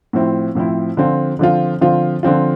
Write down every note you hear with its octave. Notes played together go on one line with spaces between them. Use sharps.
A2 F3 C4 E4
A2 F3 C4 E4
D3 F3 C4 F4
D3 F3 C4 F4
D3 F3 C4 F4
D3 F3 C4 F4